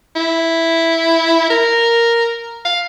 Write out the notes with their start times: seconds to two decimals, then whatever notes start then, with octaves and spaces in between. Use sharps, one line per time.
0.16 E4
1.50 A#4
2.65 F5